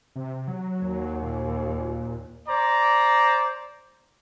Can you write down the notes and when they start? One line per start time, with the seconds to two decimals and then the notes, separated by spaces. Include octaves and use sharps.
0.16 C3
0.48 F#3
0.82 D#2
1.22 A#2
2.48 C5 D5 A#5